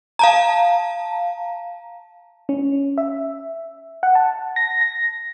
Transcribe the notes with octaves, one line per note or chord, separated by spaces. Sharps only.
F5 A5 A#5
C#4
E5
F#5
A5
A#6
A#6